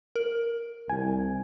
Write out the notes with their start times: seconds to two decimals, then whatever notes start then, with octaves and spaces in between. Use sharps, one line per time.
0.16 A#4
0.90 C2 G#5